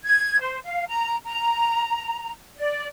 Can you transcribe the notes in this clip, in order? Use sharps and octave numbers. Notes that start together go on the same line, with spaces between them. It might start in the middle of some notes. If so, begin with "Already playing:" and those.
G#6
C5
F5
A#5
A#5
D5